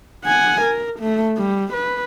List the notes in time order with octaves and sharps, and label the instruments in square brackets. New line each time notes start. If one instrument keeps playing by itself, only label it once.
[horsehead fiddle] F#5 G#5
A#4
A3
G3
B4